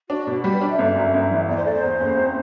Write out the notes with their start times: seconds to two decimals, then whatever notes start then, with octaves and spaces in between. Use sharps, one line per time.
0.09 D4 F#4
0.27 B2
0.44 G3 G4
0.53 B4
0.61 D4 D5
0.70 E5
0.79 G1
0.96 F#2
1.14 G1
1.31 E3
1.48 E2 D5
1.57 C5
1.66 A3 D5
1.74 C5
1.83 E2
2.01 F#1
2.17 C4